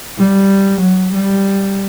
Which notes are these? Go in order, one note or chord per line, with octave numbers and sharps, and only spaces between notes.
G3
F#3
G3